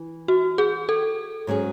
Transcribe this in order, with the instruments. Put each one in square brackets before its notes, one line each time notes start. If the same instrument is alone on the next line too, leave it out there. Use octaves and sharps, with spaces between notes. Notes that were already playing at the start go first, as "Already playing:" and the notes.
Already playing: [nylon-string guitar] E3
[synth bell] F#4
G#4
A4
[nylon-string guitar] G#2 F#3 C#4 G#4